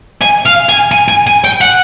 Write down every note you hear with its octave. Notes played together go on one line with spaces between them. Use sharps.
G#5
F5
G#5
G#5
G#5
G#5
G5
F#5